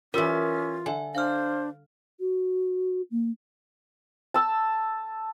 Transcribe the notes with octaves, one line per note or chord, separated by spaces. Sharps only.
E3 G3 C#4 F4 A#4 E6 B6
D3 E5 G#5
D4 C5 F5 F6
F#4
A#3
A5 E6